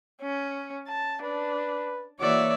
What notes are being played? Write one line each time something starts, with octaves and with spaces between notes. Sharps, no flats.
C#4
A5
D4 B4
E3 A#3 F#4 C#5 D5 E5